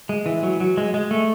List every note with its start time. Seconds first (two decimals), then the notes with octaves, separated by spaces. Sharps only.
0.09 G#3
0.26 E3
0.43 F#3
0.60 F#3
0.77 G#3
0.94 G#3
1.11 A3